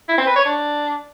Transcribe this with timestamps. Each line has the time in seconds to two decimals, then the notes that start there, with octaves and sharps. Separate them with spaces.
0.08 E4
0.18 C4
0.27 B4
0.36 C#5
0.45 D4